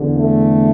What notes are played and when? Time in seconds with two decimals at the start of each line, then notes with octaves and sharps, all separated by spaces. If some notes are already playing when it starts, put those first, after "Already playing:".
Already playing: E2 D3
0.16 A3